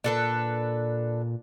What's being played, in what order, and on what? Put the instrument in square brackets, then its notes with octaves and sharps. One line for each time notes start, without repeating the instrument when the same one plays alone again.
[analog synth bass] A#2 [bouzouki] D4 A4 B4